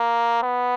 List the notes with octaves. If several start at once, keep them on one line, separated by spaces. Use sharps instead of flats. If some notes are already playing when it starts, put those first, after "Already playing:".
Already playing: A#3
B3